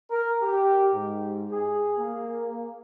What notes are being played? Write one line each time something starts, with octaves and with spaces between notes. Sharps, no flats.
A#4
G4
G#2
G#4
A#3